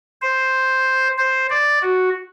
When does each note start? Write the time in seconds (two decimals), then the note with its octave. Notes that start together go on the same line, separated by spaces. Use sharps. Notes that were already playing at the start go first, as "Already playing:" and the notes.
0.21 C5
1.18 C5
1.50 D5
1.82 F#4